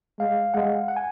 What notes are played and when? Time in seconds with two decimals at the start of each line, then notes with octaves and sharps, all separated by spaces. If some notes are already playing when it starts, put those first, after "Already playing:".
0.19 G#3 F5
0.54 G#3 F#5
0.88 F#5
0.96 G#5